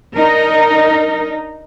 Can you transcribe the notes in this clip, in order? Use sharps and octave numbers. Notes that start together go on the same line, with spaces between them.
D4 D#4 A#4